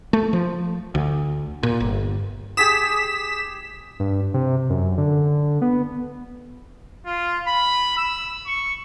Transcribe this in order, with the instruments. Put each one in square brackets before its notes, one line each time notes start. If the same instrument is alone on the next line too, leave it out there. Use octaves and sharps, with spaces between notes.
[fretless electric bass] A3
F3
D2
A#2
G1
[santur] G4 G#4 D#6 [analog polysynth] B6 E7
[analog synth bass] G2
C3
F#2
D3
B3
[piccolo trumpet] F4
B5
E6
C#6